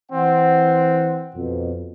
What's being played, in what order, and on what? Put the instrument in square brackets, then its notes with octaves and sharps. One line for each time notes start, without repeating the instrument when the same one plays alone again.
[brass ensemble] E3 F#5 [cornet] C4
[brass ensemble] F2 B2